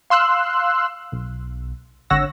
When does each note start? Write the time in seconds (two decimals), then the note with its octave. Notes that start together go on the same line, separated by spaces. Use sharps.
0.10 F5 C6 E6 F#6
1.12 B1
2.10 G#1 D3 C#5 F#5 E6 A#6